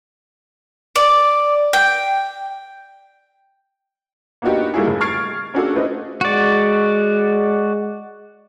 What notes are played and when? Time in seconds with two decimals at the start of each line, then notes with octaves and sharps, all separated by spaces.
0.96 D5
1.73 G5
4.42 A#3 B3 D4 D#4 F#4 G4
4.74 G3 A3 A#3 E4 F#4 G#4
4.87 F1
5.01 C#6 F6 G#6 A6 C7 D7
5.54 A#3 C#4 D4 F#4 G#4 A4
5.74 A3 D4 E4 B4 C5 D#5
6.21 G#3 F#4 D5